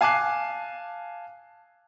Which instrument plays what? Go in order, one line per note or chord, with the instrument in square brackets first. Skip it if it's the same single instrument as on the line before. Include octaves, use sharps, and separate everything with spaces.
[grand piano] F5 G#5 A5 D6 F#6 C7